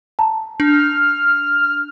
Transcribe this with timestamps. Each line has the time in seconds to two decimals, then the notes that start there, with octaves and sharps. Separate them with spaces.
0.19 A5 A#5
0.60 D4 F6